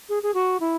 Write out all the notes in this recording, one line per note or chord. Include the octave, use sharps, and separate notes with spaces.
G#4
G#4
F#4
E4